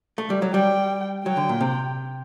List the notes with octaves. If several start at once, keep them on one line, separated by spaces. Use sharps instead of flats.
A3
G3
F#3
G3 G5
F#3 G5
D3
A#2
C3